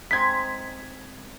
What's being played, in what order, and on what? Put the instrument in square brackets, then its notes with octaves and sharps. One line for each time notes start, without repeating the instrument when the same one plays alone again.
[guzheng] G#3 C4 D#4 [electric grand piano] G#6 B6